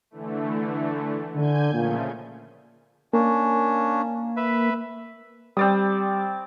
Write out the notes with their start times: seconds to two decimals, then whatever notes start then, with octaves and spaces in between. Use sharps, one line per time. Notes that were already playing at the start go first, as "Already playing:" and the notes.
0.11 D3 E3 A3
1.36 D3 G#5 G6 G#6
1.73 A#2 C#3 F3 A3
3.13 A#3 C#4 D4
4.37 B4 E5
5.57 G3 C4 D5 D#6